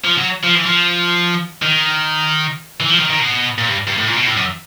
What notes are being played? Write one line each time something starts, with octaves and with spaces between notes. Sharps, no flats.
F3
F#3
F3
E3
F3
D#3
E3
F3
D#3
D#3
B2
A#2
G2
G2
A2
A#2
B2
A2
F#2